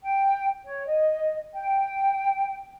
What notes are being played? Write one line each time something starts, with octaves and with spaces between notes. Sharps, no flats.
G5
C#5
D#5
G5